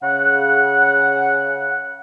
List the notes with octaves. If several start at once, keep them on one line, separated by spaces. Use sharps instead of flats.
C#3 F#5